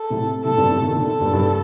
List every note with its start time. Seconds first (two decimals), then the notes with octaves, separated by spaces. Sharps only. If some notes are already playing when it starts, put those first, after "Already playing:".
Already playing: A4
0.10 A2 C3
0.44 A2 C3 A4
0.57 G2 A#2
0.70 A2 C3
0.82 C3 D#3
0.95 A#2 D3 A4
1.20 G2 A#2
1.33 G2